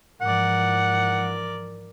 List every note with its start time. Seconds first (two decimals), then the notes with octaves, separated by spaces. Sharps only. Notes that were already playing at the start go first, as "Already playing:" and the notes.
0.21 G#2 E3 F3 A#4 D5 F#5